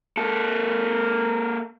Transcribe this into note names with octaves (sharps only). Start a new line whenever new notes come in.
A#3 A4